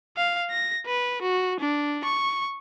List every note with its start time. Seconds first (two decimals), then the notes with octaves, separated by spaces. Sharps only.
0.17 F5
0.51 A#6
0.86 B4
1.22 F#4
1.60 D4
2.05 C#6